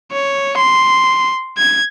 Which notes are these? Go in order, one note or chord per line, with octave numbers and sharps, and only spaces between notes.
C#5
C6
G#6